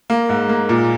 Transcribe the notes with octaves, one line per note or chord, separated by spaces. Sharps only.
A#3
G#2
A#3
A#2